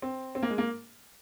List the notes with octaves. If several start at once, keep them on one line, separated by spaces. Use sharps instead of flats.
C4
C4
A#3
G#3
A#3